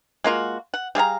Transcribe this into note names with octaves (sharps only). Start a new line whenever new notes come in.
G#3 A#3 F4 F#4
F#5
G3 G#4 F5 A#5